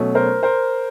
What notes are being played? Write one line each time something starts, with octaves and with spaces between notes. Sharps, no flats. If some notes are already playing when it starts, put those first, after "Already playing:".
Already playing: B2 F#3 A3 C#4
A#4 C5
A#4 C5